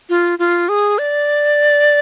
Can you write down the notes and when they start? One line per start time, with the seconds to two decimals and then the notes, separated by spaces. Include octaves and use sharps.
0.09 F4
0.39 F4
0.69 G#4
0.99 D5